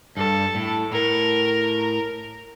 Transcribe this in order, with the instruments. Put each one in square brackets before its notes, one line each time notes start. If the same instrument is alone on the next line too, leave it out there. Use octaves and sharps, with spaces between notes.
[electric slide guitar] G2 [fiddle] A4
[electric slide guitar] A2
[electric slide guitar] A2 [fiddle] A#4